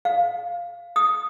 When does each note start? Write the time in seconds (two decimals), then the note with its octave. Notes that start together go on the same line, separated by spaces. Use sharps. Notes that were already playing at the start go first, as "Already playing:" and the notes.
0.05 F5
0.96 D#6